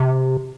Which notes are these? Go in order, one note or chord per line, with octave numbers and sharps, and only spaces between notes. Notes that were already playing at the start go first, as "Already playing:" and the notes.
Already playing: C3